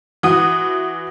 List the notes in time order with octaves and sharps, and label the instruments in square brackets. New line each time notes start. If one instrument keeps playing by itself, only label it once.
[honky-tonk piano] E3 F#4 D#6